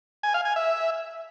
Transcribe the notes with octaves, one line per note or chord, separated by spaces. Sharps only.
G#5
F5
G#5
E5